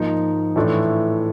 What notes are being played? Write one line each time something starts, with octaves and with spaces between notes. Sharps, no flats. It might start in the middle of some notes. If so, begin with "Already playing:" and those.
Already playing: G#2 F3 A#3 D#4
A2 E3 A3 D4 F4